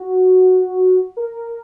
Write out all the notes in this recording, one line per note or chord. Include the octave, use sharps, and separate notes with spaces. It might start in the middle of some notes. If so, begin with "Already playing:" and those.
Already playing: F#4
A#4